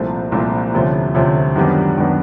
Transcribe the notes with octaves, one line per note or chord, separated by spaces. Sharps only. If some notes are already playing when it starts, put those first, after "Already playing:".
Already playing: C2 A#2 F3 A3 C4
C2 A#2 F3 A3 C4
D2 C3 F3 A3 C#4
D2 C3 F3 A3 C#4
F#2 D#3 G3 B3 D4
F#2 D#3 G3 B3 D4